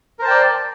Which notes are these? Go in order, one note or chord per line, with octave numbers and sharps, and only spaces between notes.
A#4 C5 D5 G5 A5